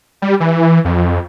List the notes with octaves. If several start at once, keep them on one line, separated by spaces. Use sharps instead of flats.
G3
E3
F2